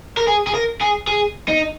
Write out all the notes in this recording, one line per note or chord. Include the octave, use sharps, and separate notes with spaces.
A#4
G#4
G#4
A#4
G#4
G#4
D#4